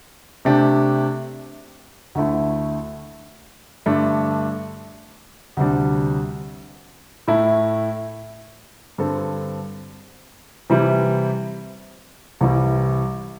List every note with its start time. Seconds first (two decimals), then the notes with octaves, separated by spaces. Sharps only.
0.45 C3 A3 D4 G4
2.15 D2 D3 A3 E4
3.86 G2 D3 A3 D4
5.57 D2 C3 G3 D4
7.28 A2 A3 E4
8.98 G2 D3 C4 A4
10.70 C3 E3 G3 E4
12.41 C2 C3 E3 G3 E4